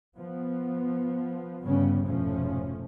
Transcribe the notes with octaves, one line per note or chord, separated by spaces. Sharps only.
F3 B3
G1 C#3 G3 B3 C#4
F1 G#2 B2 F3 A3 C#4